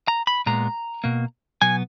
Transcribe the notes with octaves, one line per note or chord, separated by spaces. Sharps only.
A#5
B5
A#2 G#3 B3 A#5
B2 A#3
B2 F#3 B3 G#5